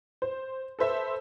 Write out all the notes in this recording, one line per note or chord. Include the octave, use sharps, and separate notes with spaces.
C5
A4 B4 C5 E5